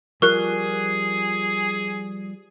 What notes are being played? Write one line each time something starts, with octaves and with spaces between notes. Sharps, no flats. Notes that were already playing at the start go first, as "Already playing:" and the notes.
F3 G3 F4 G#4 A#4 C#6 F#6